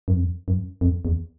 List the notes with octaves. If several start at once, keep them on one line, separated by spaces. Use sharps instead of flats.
F#2
F2
F#2
F2
E2